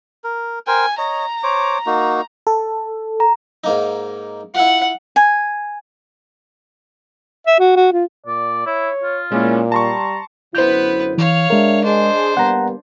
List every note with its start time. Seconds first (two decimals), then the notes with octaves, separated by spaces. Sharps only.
0.24 A#4
0.67 A#4 C5 G5 G#5
0.98 C#5 D#5 A#5
1.43 C5 C#5 D6
1.86 A#3 D#4 F#4
2.47 A4
3.20 A#5
3.64 G#2 A#3 D#4
4.55 E4 F4 F#5
5.16 G#5
7.47 E5
7.59 F#4
7.76 F#4
7.93 F4
8.26 A#2 D5
8.66 E4 C#5
9.02 F4
9.32 A#2 G#3 A#3 C#4 E4
9.72 G3 A5 A#5 C6 C#6
10.55 F#2 D3 B3 E4 B4 C5 G6
11.18 E3 C#5 F5
11.50 G#3 D4 A#4 E5
11.84 D4 G#4 C5 D#5
12.37 G3 A#3 B3 F#5 A#5